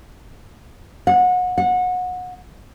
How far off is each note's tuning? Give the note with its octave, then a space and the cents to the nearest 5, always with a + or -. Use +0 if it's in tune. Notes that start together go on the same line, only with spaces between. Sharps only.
F#5 -30
F#5 -25